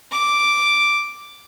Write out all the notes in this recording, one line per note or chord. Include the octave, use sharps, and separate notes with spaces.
D6